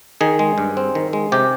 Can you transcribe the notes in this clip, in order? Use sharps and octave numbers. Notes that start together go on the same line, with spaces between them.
D#3 G#4
G#3
G2
C4
D#3
G#3
C3 G4